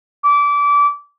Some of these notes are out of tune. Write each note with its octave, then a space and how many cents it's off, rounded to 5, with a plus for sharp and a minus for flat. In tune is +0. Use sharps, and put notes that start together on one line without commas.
D6 -25